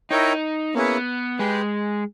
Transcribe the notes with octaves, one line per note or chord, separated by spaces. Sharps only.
D#4 E4 A#4 C#5 G5
A#3 B3 C#4 E4 G#4 B4
G#3 G4 B4 G5